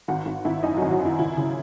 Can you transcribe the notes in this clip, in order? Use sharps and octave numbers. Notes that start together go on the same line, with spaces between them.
G#1 F#4 F#5
G#1
G#1 E4 E5
F#2 D#4 D#5
F#3 F#4
G#1
F#3 F#4
F#2 E4
C#2 E4
C#3